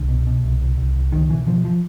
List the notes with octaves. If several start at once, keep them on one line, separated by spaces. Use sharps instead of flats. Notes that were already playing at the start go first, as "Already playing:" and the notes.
Already playing: C2 D3
B2
B2
C2
C2
C2
C2
C#2 D#3
B2 E3
B2 F3
F3